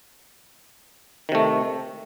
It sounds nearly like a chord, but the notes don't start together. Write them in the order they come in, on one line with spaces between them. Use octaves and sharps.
D#3 C3 A3